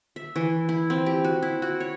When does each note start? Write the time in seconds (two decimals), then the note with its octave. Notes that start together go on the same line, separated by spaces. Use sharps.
0.16 E5
0.36 E3
0.69 E4
0.90 C4
1.06 G4
1.24 F#4
1.42 E4
1.62 F#4
1.80 C#5